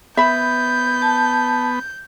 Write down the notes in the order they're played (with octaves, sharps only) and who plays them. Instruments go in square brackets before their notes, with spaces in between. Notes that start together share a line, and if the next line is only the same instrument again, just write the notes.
[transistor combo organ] B3 [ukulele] E5 B5 [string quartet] G6
[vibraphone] A5